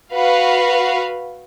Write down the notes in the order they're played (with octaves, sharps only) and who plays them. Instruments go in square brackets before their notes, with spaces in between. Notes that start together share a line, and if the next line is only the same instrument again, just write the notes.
[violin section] F#4 B4 F5